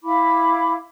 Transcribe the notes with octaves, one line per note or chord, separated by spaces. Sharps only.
E4 F5 B5 D6